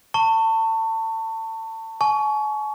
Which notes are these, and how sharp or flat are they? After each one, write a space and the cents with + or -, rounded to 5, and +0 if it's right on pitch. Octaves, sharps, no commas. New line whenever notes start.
A5 +30 C#6 +0
G#5 +40 C#6 +20